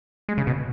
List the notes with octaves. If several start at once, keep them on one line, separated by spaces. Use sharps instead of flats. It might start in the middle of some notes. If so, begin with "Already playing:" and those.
G#3
C#3
B2